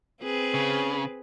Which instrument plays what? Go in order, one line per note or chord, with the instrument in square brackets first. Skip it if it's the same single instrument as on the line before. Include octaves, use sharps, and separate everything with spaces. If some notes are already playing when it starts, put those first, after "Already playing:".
[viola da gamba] C4 G#4 B4
[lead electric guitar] C#3